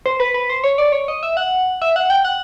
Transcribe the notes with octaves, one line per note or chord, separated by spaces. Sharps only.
C5
B4
B4
C5
C#5
D5
C#5
D#5
E5
F#5
E5
F#5
G5
F#5